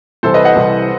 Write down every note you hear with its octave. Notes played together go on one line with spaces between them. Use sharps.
C2 C3 E3 A4 C5
B4 D#5
D#5 F#5
C2 C3 E3